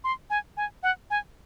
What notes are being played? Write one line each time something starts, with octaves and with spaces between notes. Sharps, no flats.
C6
G#5
G#5
F#5
G#5